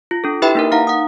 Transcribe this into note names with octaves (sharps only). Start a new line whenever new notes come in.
F4
D4 A4
E4 G4 B4 E5 G5 B5
A#3 D#4 A#4
D#4 F5 F#5 A#5
F#5 D#6